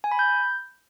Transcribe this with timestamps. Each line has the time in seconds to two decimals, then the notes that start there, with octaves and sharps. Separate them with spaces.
0.04 G#5
0.11 B5
0.19 G6